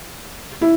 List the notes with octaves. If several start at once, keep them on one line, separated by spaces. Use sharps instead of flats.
E4